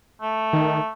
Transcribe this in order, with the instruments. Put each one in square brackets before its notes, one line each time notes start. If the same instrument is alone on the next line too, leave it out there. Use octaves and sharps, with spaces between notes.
[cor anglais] A3
[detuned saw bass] D#3